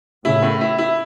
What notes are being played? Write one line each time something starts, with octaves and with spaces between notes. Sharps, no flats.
A2 C#3 E4
A2
E4
E4